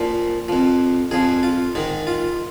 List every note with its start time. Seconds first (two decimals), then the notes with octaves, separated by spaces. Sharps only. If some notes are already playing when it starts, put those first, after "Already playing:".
Already playing: A#2 F3
0.48 F2 F3
1.11 F2 F3 G#4
1.43 F4
1.75 G#2 D#3 D#4
2.07 F4